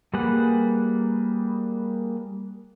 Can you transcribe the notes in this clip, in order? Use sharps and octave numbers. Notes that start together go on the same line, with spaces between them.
G3 A#3 G#4 B4 F#5